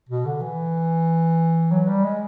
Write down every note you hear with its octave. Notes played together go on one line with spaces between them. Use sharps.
B2
D3
E3
F#3
G3
G#3